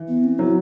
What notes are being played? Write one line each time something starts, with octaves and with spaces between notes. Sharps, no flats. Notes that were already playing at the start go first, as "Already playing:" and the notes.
Already playing: E3
B3
C4
F#3 E4